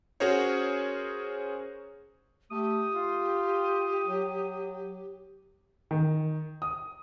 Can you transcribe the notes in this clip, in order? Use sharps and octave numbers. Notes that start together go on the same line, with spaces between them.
C#4 F#4 G#4 A#4 C5 C#5
A3 G4 D#6
F4
F#3
D#3
D#6